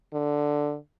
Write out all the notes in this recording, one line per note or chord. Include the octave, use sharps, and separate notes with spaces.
D3